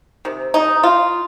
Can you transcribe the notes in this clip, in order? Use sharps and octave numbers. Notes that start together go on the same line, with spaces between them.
C3 D#3
D#4
F4